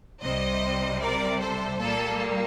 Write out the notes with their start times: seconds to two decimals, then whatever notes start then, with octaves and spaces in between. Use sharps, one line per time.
0.23 C2 C3 G3 C5 D#5
1.01 A#4 D5
1.40 A4 C5
1.79 A#2 G3 A#3 A4